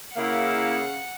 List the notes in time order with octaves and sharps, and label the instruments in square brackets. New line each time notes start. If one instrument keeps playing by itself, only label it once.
[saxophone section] C#3 F5 [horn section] A#3 E4 [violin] F#5